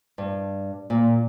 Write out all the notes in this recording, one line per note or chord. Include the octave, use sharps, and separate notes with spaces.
G2
A#2